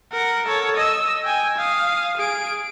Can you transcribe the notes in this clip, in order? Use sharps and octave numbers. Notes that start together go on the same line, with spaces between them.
A#4 F#5
A4 C#5
D#5 E6
G5 G#5
F5 D#6
G#4 D7